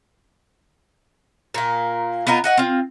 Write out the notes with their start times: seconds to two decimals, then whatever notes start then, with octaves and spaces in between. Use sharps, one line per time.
1.54 A#2 A#3
2.27 B3 D#4 F4 A#4
2.44 F#4 D#5 F#5
2.57 C4 F4